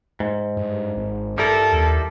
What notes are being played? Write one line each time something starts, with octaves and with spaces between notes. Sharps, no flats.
G#2
G2
G#1
G2 G3 E4 A4 A#4
D#2